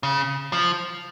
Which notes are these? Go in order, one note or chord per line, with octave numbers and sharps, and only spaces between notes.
C#3
F3